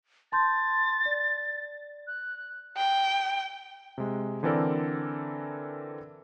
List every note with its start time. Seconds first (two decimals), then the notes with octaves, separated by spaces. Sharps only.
0.32 A5 C6 G6 A6
1.06 D5
2.07 F#6
2.77 G5
3.98 C3 G#3
4.43 D3 E3 C4 A4 A#4 D5